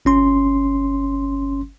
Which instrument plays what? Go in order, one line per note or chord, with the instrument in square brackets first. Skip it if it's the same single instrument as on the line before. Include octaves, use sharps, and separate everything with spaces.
[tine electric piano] G1 C#4 C6